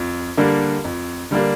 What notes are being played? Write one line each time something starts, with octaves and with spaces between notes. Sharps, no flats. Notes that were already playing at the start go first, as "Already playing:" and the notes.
Already playing: F2
D3 G3 A#3 D4
F2
D3 G3 A#3 D4